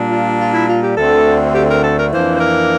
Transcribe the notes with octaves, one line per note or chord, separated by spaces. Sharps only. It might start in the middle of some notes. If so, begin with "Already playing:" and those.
Already playing: A#2 G3 D4
F4
F4
E4
F4
G4
D2 D3 A3 C4 A4
G4
A#4
A4
A#4
F2 E3 A#3 D4 C5
C5
A#4